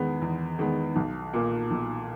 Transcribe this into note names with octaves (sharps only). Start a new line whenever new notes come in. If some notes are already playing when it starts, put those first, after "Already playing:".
Already playing: E2 D#3 G#3 B3
E2
D#3 G#3 B3
B1
A#2 A#3
B1